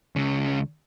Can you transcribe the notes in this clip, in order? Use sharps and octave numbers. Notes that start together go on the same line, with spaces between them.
C#2 C#3